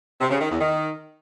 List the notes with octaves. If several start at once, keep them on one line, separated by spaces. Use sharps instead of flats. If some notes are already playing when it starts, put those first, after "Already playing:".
C3
C#3
D#3
E2
D#3